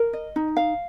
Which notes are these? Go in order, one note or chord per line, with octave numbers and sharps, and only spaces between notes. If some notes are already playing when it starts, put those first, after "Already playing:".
Already playing: A#4
D#5
D#4
F5